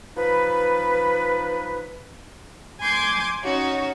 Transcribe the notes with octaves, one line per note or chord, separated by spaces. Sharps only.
F3 D#4 B4
G#5 C6 D6 G6 G#6
C#4 D#4 F#4 C#5